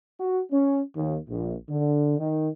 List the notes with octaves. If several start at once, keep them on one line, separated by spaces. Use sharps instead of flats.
F#4
C#4
D#2
A#1
D3
D#3